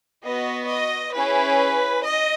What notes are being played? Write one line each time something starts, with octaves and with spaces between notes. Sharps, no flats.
B3 F#4 D#5
D#5
C#4 E4 G#4 B4
D#5